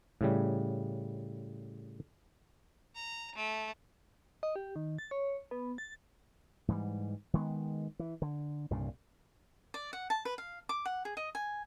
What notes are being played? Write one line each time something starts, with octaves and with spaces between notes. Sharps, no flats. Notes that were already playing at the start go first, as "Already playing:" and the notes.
A2 C#3 G3
A#5
A3
D#5
G4
D#3
A6
C#5
B3
A6
G#2 E3 F#3 G3
D#3 G#3 B3
E3
D3
C2 G2 A#2 C#3
D5
F#5
A5
B4
F5
D6
F#5
G#4
D#5
G#5